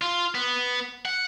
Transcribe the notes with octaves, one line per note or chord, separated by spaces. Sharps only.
F4
B3
F#5